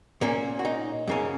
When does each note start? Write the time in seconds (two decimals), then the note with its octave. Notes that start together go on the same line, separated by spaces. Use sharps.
0.21 A#2 A#3 C#4
0.59 F#4
0.65 D#4
1.07 F#2 C#3 A#3 C#4